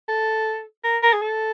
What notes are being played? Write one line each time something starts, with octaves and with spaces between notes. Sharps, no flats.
A4
A#4
A#4
G#4
A4